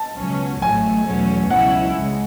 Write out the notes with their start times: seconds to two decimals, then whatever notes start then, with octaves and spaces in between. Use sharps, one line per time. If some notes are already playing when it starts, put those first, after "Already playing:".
Already playing: A5
0.17 C#2 B2 F#3 C#4
0.62 A1 A2 F#3 A3 G#5
1.07 E2 B2 F#3 A3 C#4
1.50 C#2 B2 F#3 C#4 E4 F#5
1.96 C#2 C#3 G#3